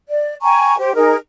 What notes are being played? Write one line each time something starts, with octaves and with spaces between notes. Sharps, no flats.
D5
G5 G#5 A#5 C#6
G4 C5
D#4 G#4 A#4